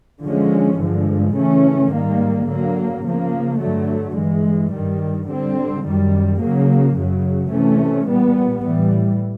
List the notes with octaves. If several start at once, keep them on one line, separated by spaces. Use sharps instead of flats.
D3 F3 G#3 C#4
G2 D3 F3 G#3
C#3 E3 A3 C#4
G#2 D#3 G3 A#3
D3 F#3 A#3
C#3 F3 A#3
G2 D3 F#3 A3
G2 E3 G#3
G2 D#3 G3
D3 G3 C4
F#2 D#3 G3
C#3 F#3 A#3
F#2 C#3 F#3
C3 E3 A3 C#4
A#2 G3 B3
A2 E3 G3